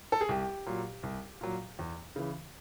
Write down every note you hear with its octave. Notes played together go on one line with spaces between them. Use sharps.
A4
G#4
C2 G4
A#2 F#3
C2
A#2 F#3
E2
C#3 E3